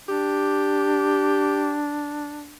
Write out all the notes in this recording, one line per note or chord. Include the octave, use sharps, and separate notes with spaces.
D4 G4